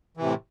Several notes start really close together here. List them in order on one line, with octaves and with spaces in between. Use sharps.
E3 C3 A2